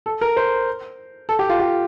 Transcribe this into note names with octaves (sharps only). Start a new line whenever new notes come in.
A4
A#4
C5
A4
G4
F4
G4